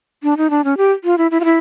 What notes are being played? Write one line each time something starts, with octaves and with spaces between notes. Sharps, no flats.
D4
D#4
D4
C#4
G4
F4
E4
E4
F4
E4